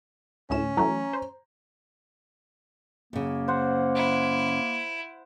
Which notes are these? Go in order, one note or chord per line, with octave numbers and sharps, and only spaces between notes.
D2 A2 C#4 E7
E3 F#3 A3 A#5
C5
F#2 C#3 A#3
C5 F#5
E4